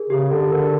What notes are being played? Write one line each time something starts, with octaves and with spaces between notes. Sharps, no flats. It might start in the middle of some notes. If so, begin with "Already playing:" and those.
Already playing: G#4 A#4
C#3 G4
D3 A4
D3 A#4